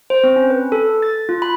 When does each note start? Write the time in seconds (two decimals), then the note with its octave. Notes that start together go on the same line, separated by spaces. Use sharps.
0.10 C5
0.24 C4
0.36 C#4
0.50 B4
0.72 A4
1.02 A6
1.29 F4
1.42 B5